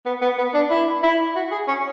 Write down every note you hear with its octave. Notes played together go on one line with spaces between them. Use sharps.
B3
B3
B3
D4
E4
E4
F#4
G#4
C#4